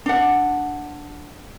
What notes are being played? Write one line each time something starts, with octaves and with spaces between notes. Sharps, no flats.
D4 F#5